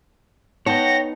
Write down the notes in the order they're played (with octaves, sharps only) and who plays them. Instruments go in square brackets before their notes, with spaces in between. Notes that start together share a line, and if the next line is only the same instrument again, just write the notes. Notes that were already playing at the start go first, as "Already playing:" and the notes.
[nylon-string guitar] B3 D#4 A5 [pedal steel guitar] C#5 G5 [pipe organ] F#5 A#6